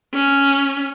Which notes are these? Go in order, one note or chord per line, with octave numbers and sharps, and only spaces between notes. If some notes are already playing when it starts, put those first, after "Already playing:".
C#4